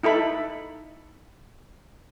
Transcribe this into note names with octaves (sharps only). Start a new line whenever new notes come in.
D#4 E4 A4 B5